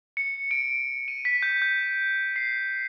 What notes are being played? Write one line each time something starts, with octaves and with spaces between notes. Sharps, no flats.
C#7
D7
D#7
B6
G6
G6
C7